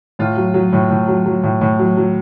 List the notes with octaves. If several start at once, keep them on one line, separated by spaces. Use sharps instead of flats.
A2 F4
F#3
F#3
A2
A2
F#3
F#3
A2
A2
F#3
F#3